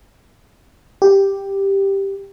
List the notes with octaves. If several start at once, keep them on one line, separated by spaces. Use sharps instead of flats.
G4